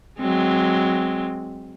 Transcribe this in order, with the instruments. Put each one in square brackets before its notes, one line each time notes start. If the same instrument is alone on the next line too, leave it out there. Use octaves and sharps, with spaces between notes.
[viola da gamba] F#3 G#3 C4